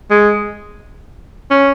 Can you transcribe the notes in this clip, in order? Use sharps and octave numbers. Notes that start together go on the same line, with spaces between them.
G#3
C#4